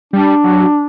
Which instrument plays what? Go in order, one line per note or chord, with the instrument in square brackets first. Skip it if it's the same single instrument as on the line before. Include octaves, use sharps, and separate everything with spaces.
[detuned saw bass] G3 [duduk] D4
[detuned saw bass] F#3